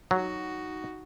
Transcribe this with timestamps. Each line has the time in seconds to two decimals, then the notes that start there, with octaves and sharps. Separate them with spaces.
0.11 F#3 D#4 F#4